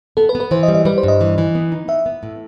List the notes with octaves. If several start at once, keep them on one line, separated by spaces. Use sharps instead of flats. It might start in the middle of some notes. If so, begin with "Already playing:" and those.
B3 A4
B4
B3
B4
E3 C5
D#5
G3
D#5
G3 B4
C5
G2 D#5
E3
E3
B3
D#4
B3 E5
B3
A2